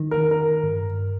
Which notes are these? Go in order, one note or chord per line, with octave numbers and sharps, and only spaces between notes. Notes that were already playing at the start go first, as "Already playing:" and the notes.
Already playing: D#3
A#4
A#4
G#2
G2